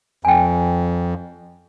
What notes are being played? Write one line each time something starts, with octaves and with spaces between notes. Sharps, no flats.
F2 G5 G#5